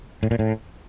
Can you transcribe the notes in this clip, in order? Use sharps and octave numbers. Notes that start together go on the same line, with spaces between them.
A2
A#2
A2